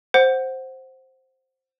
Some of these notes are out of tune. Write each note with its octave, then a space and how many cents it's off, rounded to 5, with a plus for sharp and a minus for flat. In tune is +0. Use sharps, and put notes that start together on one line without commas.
C5 +5 F#5 +0